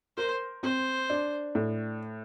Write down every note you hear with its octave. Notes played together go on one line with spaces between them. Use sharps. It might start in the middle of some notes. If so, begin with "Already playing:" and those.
A#4 C5
C4 C5
D4
A2